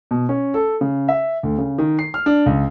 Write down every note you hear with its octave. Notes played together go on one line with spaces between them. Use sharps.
B2
C#4
A4
C#3
E5
D2
C#3
D#3
C7
F6
D4
C#2